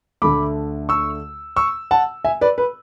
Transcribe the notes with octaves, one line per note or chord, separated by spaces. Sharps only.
D2 D3 A3 B5 D6
C#6 E6
C#6 E6
F#5 A5
E5 G#5
B4 D5
B4